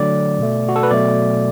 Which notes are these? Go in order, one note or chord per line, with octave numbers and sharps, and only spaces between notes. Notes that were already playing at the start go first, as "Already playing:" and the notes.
Already playing: D3 F#3 A3 D5
B2 A3
F#4
A4
B4
B2 F#3 A3 D5